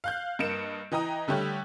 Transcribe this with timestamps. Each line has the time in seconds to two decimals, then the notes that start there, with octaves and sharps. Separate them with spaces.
0.04 F5 F#6 G6
0.39 G2 A#3 D#5 C#7 D7 E7
0.92 E3 D#5 G5 A#5 D#6
1.28 D3 G3 A3 G4 C#5 F#6